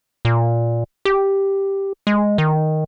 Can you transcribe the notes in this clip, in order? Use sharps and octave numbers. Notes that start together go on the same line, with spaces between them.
A#2
G4
G#3
D#3